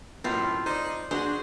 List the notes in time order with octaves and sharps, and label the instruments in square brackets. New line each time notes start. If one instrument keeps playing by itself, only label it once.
[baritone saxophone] F#2 [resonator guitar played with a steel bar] A2 [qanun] C4 F4
[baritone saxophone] D#4 [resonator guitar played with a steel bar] C5 D5
[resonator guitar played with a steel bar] D4 F#4 [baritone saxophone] G#4 [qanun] C5